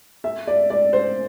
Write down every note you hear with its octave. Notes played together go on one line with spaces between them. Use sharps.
E5
D5
D5
C5